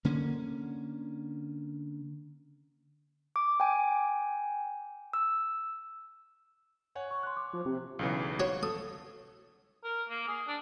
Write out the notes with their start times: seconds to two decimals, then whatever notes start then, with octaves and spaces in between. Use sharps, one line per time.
0.05 D3 A#3 C#4
3.36 D6
3.60 G5 G#5
5.13 E6
6.95 C#5 F#5 G#5
7.11 C#6
7.23 C6 F#6
7.37 D6
7.53 F3
7.66 C3
7.99 B1 C#3 E3
8.40 F#4 C#5
8.63 A4 D#6
9.84 A#4
10.09 A#3
10.27 G#4
10.48 D4